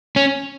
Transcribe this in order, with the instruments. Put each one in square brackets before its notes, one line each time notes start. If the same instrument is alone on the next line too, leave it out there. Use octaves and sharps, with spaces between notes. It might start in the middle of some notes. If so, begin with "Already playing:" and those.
[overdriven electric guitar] C#4